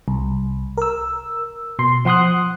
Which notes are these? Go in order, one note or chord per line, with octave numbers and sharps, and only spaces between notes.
C2
A#4 E6
B2 C6
F3 F#5 C6 D#6 F#6